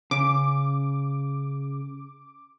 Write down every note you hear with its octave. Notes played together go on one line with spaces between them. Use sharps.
C#3 D6